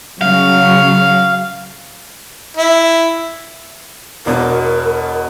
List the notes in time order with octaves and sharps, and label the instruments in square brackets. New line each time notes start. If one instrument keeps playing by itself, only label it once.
[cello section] C#3 F#3 [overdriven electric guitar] F5
[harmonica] E4
[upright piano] E1 B2 D4 [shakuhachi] A#4